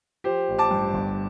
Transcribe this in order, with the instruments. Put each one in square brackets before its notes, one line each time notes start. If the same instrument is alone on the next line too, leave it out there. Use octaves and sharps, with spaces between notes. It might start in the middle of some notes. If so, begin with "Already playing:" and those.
[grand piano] F3 G4 C5
A1
A5 D6
G2
G1